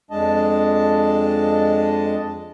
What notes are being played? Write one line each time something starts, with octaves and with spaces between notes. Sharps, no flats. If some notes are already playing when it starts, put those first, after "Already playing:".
F2 G#3 D4 D#5 A5